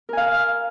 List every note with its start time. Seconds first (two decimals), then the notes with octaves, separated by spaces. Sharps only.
0.09 A#4
0.13 G#5
0.17 F5